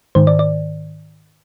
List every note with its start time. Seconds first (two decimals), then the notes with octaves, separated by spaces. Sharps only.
0.15 G#2 D#3 C5
0.27 D5
0.39 D5